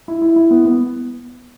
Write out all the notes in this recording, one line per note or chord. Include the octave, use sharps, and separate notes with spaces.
E4
E4
E4
B3
B3